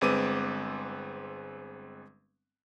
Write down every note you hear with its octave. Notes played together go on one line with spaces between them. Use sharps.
G1 G#3 C4 B4 D6 D#7